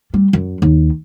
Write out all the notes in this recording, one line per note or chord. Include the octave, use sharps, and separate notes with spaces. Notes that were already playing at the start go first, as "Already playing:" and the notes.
G3
F#2
D#2